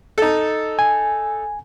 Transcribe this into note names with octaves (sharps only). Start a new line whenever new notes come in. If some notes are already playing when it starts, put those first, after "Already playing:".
D#4 A4
G#5